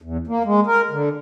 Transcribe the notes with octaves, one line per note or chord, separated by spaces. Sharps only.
E2
A#3
G#3
A#4
D3